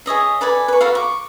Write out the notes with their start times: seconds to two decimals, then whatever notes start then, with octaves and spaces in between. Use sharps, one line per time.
0.06 G#4 C#5 D#5 E5
0.41 A4 B4 D5 G#5
0.68 B4 C#6
0.81 F#4 A4 B4 F5
0.95 C#6 D6